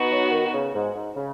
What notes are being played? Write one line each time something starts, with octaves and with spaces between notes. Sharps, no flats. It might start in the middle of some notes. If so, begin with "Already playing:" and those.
Already playing: B3 D#4 F#4
F#3
D#3
C#3
G#2
G#2
C#3